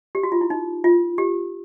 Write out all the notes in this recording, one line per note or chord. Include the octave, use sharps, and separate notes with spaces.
G4
F#4
F4
E4
D#4
F4
G4